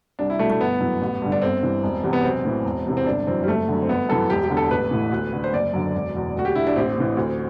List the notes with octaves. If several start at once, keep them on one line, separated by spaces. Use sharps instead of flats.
C2 D4
E4
B2 A3
A3
G1 B3
F#2 E3
A1
G2 D3
D4
G1 C4
G2 E3
E1
E2 C3
B3
B1 C4
A2 E3
E1
E2 C3 E3
C4
G1 D4
F#2 E3 C4
G3
F#1 A3
F#2 D3
C4
G1 B3
F#2 E3 A4
E1 G4
G4
E2 D3
A4
A1 B4
A2 E3
D2
D3
C5
F#1 D5
F#2 D3
E1
E2 B2
D2 F#4
G4
D3 E4
D4
A1 C4
A2 E3
D2